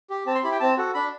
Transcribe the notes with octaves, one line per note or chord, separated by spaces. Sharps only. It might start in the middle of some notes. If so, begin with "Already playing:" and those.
G4
C4 A5
C6
E4 G4 B5
G5
C4 A5
F#4 A4
D4 B5